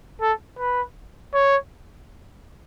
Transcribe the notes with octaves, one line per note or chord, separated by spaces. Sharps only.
A4
B4
C#5